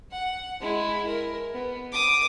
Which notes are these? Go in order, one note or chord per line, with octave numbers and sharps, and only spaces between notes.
F#5
G#3 E4
A#4
B3
D6 D#6